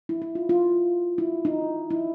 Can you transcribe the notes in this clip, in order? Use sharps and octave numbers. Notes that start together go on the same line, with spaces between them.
E4
E4
F4
F4
E4
D#4
E4